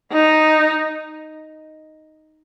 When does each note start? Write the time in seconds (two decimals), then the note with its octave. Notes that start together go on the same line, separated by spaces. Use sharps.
0.13 D#4